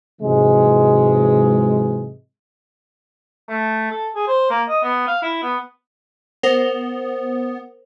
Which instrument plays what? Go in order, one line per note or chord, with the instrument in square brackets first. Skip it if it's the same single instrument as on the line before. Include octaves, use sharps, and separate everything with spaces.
[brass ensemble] G#2 C3 E3 F#3 G#3
[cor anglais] A3
A4
G#4
C5
A#3
D#5
B3
F5
E4
B3
[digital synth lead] B3 [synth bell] A#4 C5